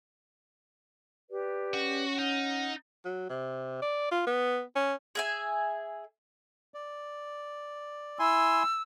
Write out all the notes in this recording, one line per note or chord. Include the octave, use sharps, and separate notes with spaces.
G4 B4 D5
C#4 F#4
D#4 F#5 F6
F#3
C3
D5
F4
B3
C#4
G#4 E5 G#5
D5
E4 G#5 C6 E6